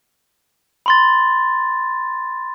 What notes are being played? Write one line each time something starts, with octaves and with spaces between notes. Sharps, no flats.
B5 C6 A6